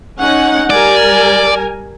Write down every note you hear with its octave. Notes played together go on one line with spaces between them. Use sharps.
C#4 D#4 F#5
G3 A#4 D5 G#5